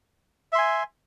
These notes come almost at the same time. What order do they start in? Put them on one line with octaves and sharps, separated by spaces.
E5 C6 G#5